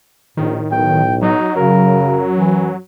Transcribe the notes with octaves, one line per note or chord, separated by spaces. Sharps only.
A#1 A2 D#3
B1 G5
F#3 D#4
F#2 C#3 A#4
E3